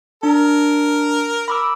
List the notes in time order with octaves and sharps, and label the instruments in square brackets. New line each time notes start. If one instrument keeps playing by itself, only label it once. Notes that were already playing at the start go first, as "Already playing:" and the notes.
[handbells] D4 [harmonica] A#4
[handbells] B5 D6 E6